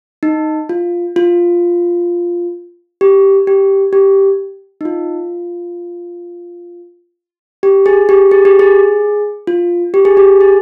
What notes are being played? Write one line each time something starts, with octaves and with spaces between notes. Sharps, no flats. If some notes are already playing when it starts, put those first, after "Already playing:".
D#4
F4
F4
G4
G4
G4
D#4
F4
G4
G#4
G4
G#4
G4
G#4
F4
G4
G#4
G4
G#4